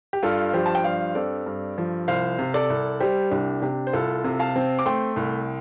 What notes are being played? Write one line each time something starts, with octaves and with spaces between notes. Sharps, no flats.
G4
G2 F4 A4
F3 G4 C5
A5
G5
G2 C5 F5
C4 A4 D5
G2
F3
C2 C5 F5
C3
A4 D5
C2
G3 G4 C5
C2 D4 G4
C3 D4 G4
C5
C2 F4 A4
C3
F5 A5
C4
D6
A3 G5 C6
C2